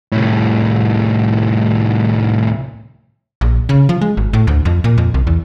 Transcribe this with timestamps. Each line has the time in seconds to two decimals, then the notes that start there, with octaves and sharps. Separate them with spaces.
0.12 C2 A2
3.41 A#1
3.69 C#3
3.89 F3
4.01 G#3
4.17 G#1
4.33 A2
4.47 D2
4.65 F2
4.84 A#2
4.98 F2
5.14 C2
5.27 E2